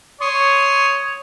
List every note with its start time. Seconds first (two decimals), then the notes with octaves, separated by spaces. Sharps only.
0.21 C#5 C6 C#6 D#6